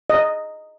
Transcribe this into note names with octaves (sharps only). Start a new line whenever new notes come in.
D#5